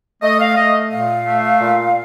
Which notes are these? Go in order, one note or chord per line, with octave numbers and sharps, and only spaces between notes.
A3 D#5
F5
A3 D#5
A#2 F5
A3
A#2